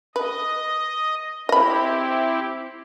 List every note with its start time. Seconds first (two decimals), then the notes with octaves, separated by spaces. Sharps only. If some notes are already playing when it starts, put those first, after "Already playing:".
0.16 B4 D#5
1.49 C4 E4 G4 D#5 B5